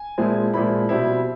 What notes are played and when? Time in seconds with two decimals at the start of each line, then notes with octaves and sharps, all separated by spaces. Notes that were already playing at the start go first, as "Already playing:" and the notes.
Already playing: G#5
0.18 A#2 F3 G#3 C4 E4
0.53 A#2 F3 G#3 C4 E4 B5
0.89 B2 G3 C4 E4